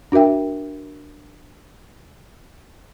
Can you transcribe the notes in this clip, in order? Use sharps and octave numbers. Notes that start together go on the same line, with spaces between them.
D4 F#4 A#4 E5 G5